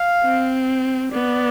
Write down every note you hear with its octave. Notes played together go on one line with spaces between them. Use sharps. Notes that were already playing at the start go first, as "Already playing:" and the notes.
Already playing: F5
C4
B3 D5